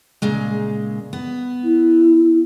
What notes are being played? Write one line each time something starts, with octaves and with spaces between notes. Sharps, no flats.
A#2 C#3 G#3
B3
E4